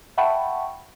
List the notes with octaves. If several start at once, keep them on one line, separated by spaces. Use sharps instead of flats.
E5 F#5 G5 A5 B5 C#6